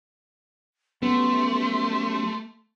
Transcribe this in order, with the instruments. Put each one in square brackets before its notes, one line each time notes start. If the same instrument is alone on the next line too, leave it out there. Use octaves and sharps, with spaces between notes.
[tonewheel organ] F#3 C#4 G4 [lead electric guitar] A3 [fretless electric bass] B3 [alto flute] C6